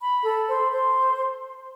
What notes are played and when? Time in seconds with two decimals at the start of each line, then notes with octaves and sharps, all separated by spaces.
0.02 B5
0.24 A4
0.48 C5
0.71 C5